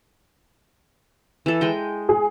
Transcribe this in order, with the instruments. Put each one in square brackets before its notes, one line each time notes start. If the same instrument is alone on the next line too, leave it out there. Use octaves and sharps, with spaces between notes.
[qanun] E3 A4
G#3 D#5 G5
[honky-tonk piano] G#4